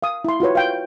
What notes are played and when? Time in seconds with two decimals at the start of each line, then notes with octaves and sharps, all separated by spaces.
0.03 F5 D#6
0.25 E4 C6
0.40 F4 F#4 B4 C#5
0.55 F5 G5